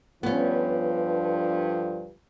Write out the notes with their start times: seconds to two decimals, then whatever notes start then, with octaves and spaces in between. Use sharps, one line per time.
0.23 G2 D3 F3 B3 C#4